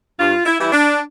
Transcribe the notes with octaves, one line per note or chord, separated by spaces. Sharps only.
G2 F4
E4
E3 G3 E4
D4